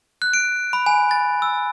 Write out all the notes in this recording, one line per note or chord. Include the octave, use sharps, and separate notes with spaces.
F#6
D7
B5
G#5
A6
E6